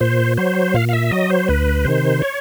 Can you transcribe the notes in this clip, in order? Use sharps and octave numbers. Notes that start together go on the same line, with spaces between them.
A#2 C5
F#3 C5
A#2 F5
F5
E5
F#3 D#5
C5
D2 B4
C3 D#3 C5
C#5